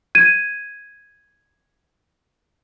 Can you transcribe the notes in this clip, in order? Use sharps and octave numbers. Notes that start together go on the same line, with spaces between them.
G#6 D#7